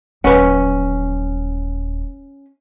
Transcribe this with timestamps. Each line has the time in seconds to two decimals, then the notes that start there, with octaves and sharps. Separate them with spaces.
0.24 D#1 F#3 C#4 B4 F#5